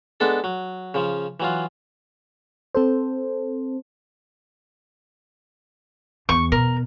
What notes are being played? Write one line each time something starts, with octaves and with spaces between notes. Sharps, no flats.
G#3 B3 D4 A4 D5
F#3
C#3 F3
E3 F#3 F4
C4 A4 C5
E2 C#6
B2 A#4